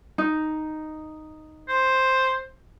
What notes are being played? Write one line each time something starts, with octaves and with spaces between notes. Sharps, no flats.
D#4
C5